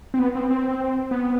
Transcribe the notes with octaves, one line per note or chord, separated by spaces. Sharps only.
C4
B3
C4
C4
B3